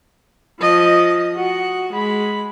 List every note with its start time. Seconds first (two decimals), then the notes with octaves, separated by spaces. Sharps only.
0.60 F3 D#5
1.35 F#4 F#5
1.93 G#3 B5